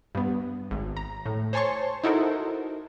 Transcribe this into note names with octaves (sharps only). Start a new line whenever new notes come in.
G2 B3
G#1
A#5
A2
C5 C#5 G#5 A5 C6 C#6
D#4 E4 F#4 A4 A#4 C5